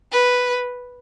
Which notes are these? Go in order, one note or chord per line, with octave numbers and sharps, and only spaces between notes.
B4